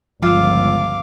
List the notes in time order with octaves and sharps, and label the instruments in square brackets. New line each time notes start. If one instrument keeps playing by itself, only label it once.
[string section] G1 C#2 [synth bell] F3 E6 [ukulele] F4 [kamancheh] F5 D6